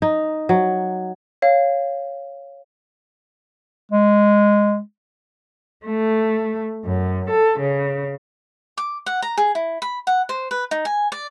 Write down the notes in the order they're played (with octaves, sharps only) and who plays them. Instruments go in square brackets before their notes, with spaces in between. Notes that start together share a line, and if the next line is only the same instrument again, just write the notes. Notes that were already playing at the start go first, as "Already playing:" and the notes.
[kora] D#4
F#3
[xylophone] C#5 F5
[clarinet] G#3
[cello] A3
F#2
A4
C#3
[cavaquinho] D6
F#5
A#5
G#4
E4
B5
F#5
C5
B4
D#4
G#5
D5